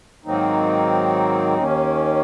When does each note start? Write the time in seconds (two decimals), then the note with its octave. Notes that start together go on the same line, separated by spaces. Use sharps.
0.25 G#2 D#3 F#3 A#3 C4 D#4
1.57 D#2 D#3 A#3 C#4